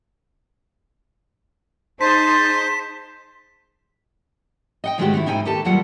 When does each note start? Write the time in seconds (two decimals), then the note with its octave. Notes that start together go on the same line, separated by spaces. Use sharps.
2.01 D#4 G#4 C5 A5 C6 B6
4.84 D#5 F#5 G5
4.98 G#2 D#3 G#3 A3 F#4 G4
5.14 D#3 C4 E4
5.26 G#2 D#4 E4 G5 G#5
5.45 D#2 G4 A4 A5
5.65 D#2 F#3 G3 F4 F#5